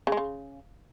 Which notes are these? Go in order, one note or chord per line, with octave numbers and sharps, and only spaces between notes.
C#3
G#3
C#3